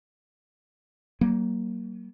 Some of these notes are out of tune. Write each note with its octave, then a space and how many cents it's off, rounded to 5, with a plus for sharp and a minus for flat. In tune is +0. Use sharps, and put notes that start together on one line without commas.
F#3 +40 A#3 +0